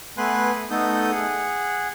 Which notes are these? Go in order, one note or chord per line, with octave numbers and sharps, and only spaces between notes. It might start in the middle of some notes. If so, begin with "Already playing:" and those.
A3 B3 B4 G#5 C6 F#6
A3 B3 D#4 A4 D#6 G6
G#4 F#5